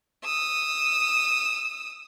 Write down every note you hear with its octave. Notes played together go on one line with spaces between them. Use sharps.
D#6 E6